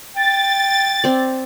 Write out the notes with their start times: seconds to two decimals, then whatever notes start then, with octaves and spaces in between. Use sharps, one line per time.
0.16 G5 A6
1.04 C4 D5